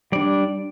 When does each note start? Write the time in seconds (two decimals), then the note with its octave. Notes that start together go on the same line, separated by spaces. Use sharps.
0.12 G3 D4 D5